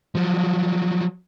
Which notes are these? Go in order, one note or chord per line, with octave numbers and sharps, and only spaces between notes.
F3 F#3